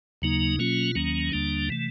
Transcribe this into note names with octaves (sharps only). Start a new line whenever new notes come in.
D#2 C#3 F#3 A#3 D#4
B2 F#3 A#3 C#4 F4
D#2 D#3 F#3 A#3 C#4
D#2 D3 G3 A#3 D4
C3 E3 A3